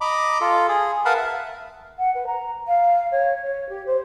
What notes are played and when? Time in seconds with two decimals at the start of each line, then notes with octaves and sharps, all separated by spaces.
0.01 D#5 A#5 B5 D6
0.41 F4 A4
0.68 G#4
1.05 A#4 B4 F5 F#5 A5 B5
1.17 E5
1.98 F#5
2.14 B4
2.26 A#5
2.67 F5
3.11 C#5
3.42 C#5
3.68 G4
3.86 C5